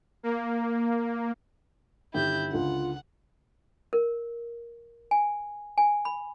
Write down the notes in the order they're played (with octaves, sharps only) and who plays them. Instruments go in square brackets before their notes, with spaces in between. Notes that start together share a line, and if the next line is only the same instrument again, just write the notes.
[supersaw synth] A#3
[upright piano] G1 D#3 G4 [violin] E4 G6
[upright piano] C#2 D3 [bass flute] F4 [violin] F#5
[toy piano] A#4
G#5
G#5
B5